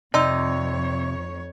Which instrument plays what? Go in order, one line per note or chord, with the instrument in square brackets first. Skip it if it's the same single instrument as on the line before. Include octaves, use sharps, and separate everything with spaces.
[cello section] F2 C#5 [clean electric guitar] C3 [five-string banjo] D#4 [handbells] D5 C6 E6